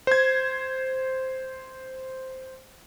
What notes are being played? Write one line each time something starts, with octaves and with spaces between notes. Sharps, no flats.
C5 G#6